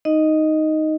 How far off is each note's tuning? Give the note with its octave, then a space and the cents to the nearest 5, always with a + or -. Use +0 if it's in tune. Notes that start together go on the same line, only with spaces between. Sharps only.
D#4 +0 D#5 +0